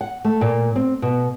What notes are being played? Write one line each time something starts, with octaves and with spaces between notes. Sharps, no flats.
F#5
A3
A#2
C4
B2